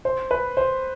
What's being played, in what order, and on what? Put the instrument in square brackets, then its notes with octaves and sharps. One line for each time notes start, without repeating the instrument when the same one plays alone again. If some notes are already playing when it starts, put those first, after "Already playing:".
[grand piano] C5
B4
C5